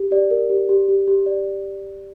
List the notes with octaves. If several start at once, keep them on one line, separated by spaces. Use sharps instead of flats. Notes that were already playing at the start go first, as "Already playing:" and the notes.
Already playing: G4
G4 D5
A#4
G4
G4
G4
G4
D5